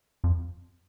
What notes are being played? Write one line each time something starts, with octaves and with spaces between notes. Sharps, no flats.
F2